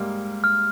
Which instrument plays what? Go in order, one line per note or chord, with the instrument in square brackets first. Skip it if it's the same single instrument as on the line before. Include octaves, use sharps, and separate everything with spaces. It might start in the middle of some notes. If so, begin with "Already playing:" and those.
Already playing: [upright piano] G#2 G3 A#3
[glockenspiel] F6